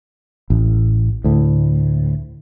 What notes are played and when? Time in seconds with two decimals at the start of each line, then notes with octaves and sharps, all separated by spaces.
0.50 A1
1.24 D2 A2